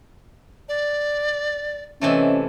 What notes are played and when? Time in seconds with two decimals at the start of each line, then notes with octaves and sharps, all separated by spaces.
0.69 D5
2.02 C3 E3 A3 C#4 D#5 E5